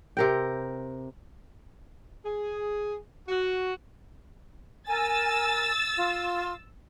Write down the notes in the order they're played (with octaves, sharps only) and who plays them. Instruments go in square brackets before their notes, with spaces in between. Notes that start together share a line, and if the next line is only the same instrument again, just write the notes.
[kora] C3 A#4 G5
[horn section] G#4
F#4
[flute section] A#4 G#5 [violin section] E6 A6
[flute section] F4